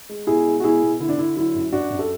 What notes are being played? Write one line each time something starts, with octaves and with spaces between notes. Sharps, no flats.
G#3
B2 E4 G#4
G#3
F#4
B2 E4 G#4
B2
D3 E4
D4
D3 E4
F#3 E4
F#2
F#2 D4 F#4
F#2
A4